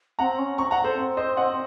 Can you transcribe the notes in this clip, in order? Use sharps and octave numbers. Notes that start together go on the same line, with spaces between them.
C4 F#5 A#5
C#4
C4 A#5 C#6
F#5 A#5
A4 C5
C4
C5 D#5
D#5 F#5